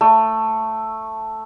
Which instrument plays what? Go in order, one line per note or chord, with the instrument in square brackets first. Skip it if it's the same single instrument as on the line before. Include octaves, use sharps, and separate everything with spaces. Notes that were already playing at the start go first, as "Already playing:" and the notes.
[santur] A3